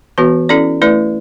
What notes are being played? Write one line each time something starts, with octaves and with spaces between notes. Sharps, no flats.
E3 B3 F#4 B4
C#4 E4 A4 D5
A3 E4 B4 D5